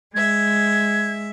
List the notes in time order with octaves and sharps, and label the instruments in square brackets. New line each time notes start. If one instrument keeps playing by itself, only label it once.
[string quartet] G#3 E5 [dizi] G#6